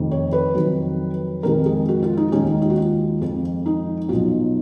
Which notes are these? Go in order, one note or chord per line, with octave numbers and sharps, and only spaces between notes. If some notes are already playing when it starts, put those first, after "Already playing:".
Already playing: F1 F2 D#3
C#5
B4
F2 D#3 F#3
F2 D#3 G#3 A#4
G#4
F#4
F4
D#4
D#2 D#3 G#3 C#4
D#4
F4
F#4
F4
F2 F3 G#3
D#4
B1 B2 F#3 F4